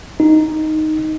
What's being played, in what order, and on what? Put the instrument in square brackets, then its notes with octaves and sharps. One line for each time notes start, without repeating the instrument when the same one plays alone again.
[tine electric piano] D#4